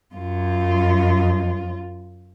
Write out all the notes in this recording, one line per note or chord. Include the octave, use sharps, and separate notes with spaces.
F#2 F4